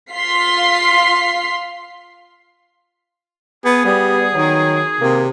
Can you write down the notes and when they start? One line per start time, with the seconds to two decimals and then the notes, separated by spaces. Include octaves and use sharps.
0.11 F4 F5 C6 B6 C7
3.65 B3 G#4
3.85 G3 B3
4.35 D#3 F#3
5.01 C3 A#3